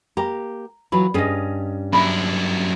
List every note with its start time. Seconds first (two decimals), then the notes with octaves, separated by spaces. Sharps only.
0.17 A#3 G4 A#5
0.92 E3 F#3 F4 B5
1.14 G2 C#4 G#4 D#5
1.93 F#2 E4 F#4 E5 B5